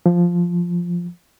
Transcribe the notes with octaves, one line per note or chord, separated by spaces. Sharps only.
F3